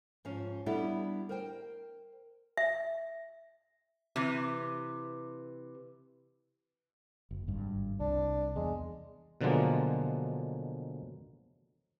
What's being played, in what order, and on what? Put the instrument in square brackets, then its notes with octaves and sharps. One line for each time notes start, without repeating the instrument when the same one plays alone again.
[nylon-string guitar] G#2 F3 C#4
G3 B3 D4 E4 G4 A4
A#4 C5 G5
[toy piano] E5
[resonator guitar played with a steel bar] C3 E3
[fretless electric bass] F#1
G#1 G2
[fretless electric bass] C2 [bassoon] D4
[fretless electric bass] E2 [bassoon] G#3
[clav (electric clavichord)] B2 D3 F3 F#3 G#3 A#3